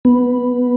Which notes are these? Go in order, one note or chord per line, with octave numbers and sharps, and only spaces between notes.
B3